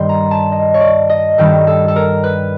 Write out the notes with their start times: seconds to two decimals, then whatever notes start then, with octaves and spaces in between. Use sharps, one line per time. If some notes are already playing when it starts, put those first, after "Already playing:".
Already playing: G2 D#3 G3 C6
0.09 A#5
0.31 A5
0.52 D#5
0.74 C#5
0.81 D5
1.10 D#5
1.38 G2 D#3 G3 A4
1.67 A4
1.88 A4
1.96 A#4
2.24 B4